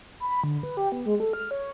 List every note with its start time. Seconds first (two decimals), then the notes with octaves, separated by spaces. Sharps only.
0.20 B5
0.44 D3
0.63 B4
0.77 G4
0.92 B3
1.06 G#3
1.20 A4
1.33 F6
1.51 C#5